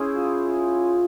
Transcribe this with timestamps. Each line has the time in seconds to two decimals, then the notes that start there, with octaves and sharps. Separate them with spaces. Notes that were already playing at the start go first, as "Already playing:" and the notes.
Already playing: C#4 E4 G#4 C5
0.14 F4